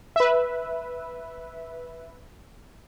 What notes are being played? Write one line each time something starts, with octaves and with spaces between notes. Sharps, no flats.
B4 E5